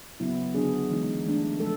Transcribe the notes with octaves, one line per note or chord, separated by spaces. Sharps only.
C#3 F#3 B3 E4
D3 F#3 B3 D4 G#4
E3 G#3 B3 D#4
E3 A3 D4
C#3 F3 G#3 A4